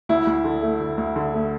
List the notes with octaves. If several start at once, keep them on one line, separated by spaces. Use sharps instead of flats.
D2 E4
D2
D3
A3
D2
D2
D3
A3